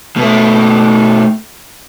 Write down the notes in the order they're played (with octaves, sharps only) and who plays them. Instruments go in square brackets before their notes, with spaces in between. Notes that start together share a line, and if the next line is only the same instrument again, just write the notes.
[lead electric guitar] B2 A3